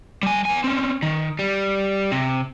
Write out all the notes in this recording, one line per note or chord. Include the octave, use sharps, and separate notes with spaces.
G3 G#5
B3 G#5
C4 C#4
D#3
G3
C3